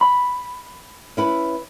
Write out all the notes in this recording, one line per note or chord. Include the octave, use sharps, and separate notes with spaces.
B5
C#4 E4 B4